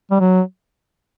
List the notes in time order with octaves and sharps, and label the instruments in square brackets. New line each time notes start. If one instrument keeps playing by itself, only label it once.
[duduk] G3
F#3